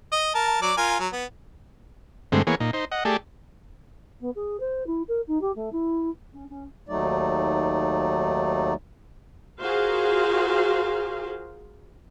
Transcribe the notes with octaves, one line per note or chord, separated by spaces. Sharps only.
D#5
A#4 A5
F#3 D5 D6
F4 A#4 G#5
F#3
B3
G2 D3 G#3 A3 C4
E3 A#3 B3 G#4 C#5
A#2 D#4
D#4 C5
D#5 F#5
A3 G4 G#4 D5 A5
B3
G#4
C5
E4
A#4
D#4
G4
A3
E4
C#4
C#4
D#2 F#3 A3 D#4 D5
F4 F#4 G#4 A#4 C5 F5